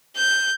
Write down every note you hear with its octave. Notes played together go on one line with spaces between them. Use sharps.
G6